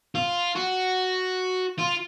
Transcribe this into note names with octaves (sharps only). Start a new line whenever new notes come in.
F4
F#4
F4